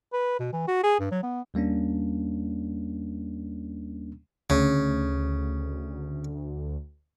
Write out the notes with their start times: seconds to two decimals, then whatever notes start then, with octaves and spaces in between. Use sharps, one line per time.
0.13 B4
0.40 B2
0.53 E3
0.68 F#4
0.84 G#4
1.00 G2
1.11 F#3
1.23 B3
1.54 D#2 G3 A#3 C#4 D4
4.50 D2 C#3